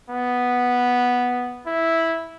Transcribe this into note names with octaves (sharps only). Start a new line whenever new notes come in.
B3
E4